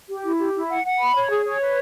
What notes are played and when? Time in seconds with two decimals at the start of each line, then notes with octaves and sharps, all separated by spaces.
0.09 G4
0.24 E4
0.39 G4
0.55 E4
0.70 F#5
0.85 F#5
0.99 B5
1.15 C#5
1.30 G#4
1.46 C#5
1.60 B4